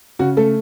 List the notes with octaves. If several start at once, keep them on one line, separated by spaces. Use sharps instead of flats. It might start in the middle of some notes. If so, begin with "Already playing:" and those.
C#3 F#4
A3 A4